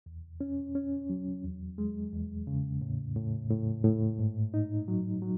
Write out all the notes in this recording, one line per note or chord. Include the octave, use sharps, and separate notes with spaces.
E2
C#4
C#4
F#3
E2
G#3
E2
C#3
A2
A2
A2
A2
G#2
D#4
F#3
F#3